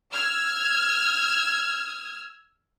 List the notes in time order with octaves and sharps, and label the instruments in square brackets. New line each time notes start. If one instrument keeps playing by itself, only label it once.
[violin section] E6 F6 G#6